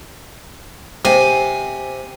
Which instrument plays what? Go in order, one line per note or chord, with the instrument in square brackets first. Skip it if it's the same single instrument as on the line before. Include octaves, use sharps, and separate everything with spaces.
[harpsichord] C3 [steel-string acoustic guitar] G#5